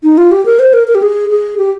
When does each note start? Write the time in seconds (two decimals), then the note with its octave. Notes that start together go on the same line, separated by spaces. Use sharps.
0.03 D#4
0.18 F4
0.31 G4
0.46 A#4
0.59 C5
0.73 A#4
0.87 A#4
0.95 G4
1.02 G#4
1.29 G#4
1.58 G4